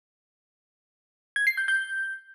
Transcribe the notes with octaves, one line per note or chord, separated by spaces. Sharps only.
G#6
C7
G6
G6